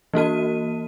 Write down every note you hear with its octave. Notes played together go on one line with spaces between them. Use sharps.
E3 A#3 F#4 D#7